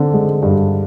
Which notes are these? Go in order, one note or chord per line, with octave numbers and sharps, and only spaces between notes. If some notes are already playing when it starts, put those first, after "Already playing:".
Already playing: D3 C4
G#3
G2